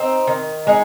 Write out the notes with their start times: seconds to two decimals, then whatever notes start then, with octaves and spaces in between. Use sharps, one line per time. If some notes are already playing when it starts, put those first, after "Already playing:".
Already playing: C4 D#4
0.27 D#3
0.67 G#3 D#4